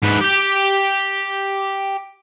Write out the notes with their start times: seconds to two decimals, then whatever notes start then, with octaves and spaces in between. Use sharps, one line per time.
0.03 G#2 B4
0.21 G4 G5